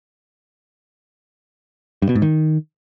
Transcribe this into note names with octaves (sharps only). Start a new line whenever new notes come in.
G2
B2
G#2
D#3